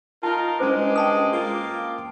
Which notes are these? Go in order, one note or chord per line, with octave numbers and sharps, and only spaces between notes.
D#4 F4 A#4 A5
G2 G#3 C#4 E4 C5 D6
G5 A5 D#6
A#3 F4